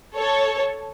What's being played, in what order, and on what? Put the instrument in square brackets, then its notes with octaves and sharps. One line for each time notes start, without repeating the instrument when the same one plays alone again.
[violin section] A4 C#5